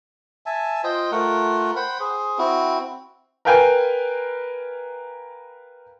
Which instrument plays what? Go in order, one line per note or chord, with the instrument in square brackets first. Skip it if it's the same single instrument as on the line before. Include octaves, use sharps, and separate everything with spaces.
[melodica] E5 G#5 A5
F4 C5 D#5 G5
A3 F4 A#4 F#5
C5 F#5 G5 B5
G#4 C5
C4 E4 F#4
[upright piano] A#4 B4 F5 G5 G#5